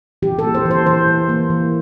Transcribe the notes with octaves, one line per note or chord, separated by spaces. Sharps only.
E3 G4
A4
A#3
C5
E3
C5
E3 C5
A#3
A#3
E3